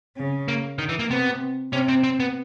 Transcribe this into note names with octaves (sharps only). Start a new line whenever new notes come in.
C#3
A#3
D#3
E3
A#3
C3 B3
C3 C#4
C4
C4
B3